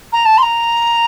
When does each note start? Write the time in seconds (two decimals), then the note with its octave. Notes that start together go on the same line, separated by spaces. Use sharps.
0.13 A#5
0.26 A5
0.38 C6
0.42 A#5